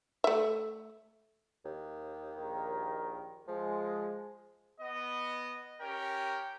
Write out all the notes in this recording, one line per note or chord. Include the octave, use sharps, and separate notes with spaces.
A3 E5
D#2
A#1 D#3 A#4
F3 G#3
B3 D#5
C#4 G4 A#4 G5